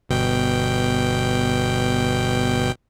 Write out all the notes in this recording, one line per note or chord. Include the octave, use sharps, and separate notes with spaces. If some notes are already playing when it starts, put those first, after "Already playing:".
G1 B2 G5